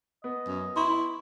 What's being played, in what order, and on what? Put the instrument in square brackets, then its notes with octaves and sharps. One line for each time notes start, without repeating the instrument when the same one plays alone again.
[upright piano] B3 [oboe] D#5
[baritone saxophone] F#2
[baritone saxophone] E4 [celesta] C6 C#6